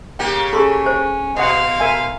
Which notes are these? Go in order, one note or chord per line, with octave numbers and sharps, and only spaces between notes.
C#3 A#3 G4 G5
C#4 G#4 A4 C6 C#6
C5
B2 D#5 F5 F#5 C6
A#4 E5 G#5